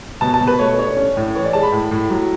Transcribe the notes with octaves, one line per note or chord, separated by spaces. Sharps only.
B2 A5
A5
B2
B4
A3 C#5
D4 C#5
C#4
A2
E3 C#5
D5
G#3 A5
B5
A2
A2
F#3